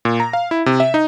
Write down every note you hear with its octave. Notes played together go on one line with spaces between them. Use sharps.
A#2
A#5
F5
E4
C3
E5
D#4